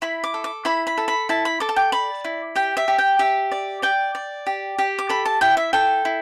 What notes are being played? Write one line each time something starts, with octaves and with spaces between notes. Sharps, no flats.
E4 B5
D6
A4
D6
E4 B5
B5
A4
B5
E4 A5
B5
A4 D6
A5
G5
D5 B5
E4
G4 G5
E5
G4
G5
G4 E5
D5
D5 G5
D5
G4
G4
D6
A4 B5
A5
E4 G5
E5
A4 G5
E4